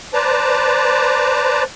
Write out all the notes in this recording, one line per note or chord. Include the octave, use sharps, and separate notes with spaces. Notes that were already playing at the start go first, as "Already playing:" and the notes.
B4 C5 D5 A5 A#5